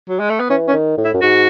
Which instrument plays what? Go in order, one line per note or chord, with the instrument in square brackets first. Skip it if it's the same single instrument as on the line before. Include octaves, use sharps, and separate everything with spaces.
[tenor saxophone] F#3
G#3
A3
B3
[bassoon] E3 [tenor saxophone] C#4
[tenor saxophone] C#4
[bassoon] D#3
A2
[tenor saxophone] E4
[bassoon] F#2
[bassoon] G#2 [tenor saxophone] F#4